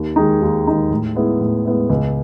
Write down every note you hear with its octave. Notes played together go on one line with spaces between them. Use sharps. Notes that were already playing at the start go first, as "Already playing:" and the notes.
Already playing: D#2
D#3 G#3 D#4 G#4
D#2
D#3 G#3 D#4 G#4
A2
G#3 B3 E4
A2
G#3 B3 E4
C#2